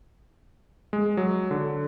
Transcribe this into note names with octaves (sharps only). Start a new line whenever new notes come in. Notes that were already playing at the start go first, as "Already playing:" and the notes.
G#3
F#3
D3